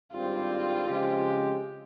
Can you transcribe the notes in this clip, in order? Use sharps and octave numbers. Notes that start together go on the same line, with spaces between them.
G#1 G2 G3 C4 F4 G4
C#3 F3 G#3 C4 G4